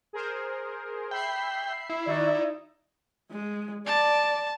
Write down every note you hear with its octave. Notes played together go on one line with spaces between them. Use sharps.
G#4 A#4 C5
E5 G5 B5 C7
E4
D#3 D#4 F#4 D5
D#4
G#3
D5 A5